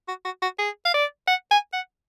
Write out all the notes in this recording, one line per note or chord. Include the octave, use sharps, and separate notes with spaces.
F#4
F#4
F#4
G#4
F5
D5
F#5
G#5
F#5